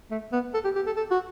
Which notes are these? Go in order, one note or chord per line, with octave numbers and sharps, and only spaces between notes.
A3
B3
A4
G4
G4
A4
A4
F#4